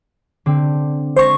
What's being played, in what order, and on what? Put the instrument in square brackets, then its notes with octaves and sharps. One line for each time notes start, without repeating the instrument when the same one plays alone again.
[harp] D3 C4
[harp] G#3 C#6 A#6 [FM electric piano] C5